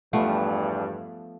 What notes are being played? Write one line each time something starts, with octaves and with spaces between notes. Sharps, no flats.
E2 G2 F3 A3 B3